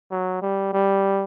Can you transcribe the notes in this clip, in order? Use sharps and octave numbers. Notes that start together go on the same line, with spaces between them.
F#3
G3
G3